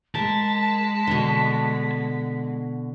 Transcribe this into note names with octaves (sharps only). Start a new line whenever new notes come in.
G#3 A#4 A5 B6
B2 D3